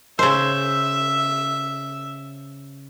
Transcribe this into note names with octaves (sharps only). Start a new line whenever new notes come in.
C#3 C5 E5